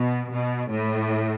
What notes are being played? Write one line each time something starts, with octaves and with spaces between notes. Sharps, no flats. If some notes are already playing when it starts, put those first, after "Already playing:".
Already playing: B2
B2
A2